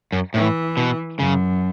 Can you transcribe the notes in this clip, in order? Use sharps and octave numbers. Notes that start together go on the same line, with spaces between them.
F#2
A2 E3
B2
F#2 C#3